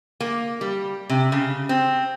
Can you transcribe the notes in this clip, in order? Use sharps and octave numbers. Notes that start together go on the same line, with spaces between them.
A#3
G3
C3
C#3
C4